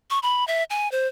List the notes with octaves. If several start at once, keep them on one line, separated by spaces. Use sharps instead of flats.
C#6
B5
E5
G#5
C5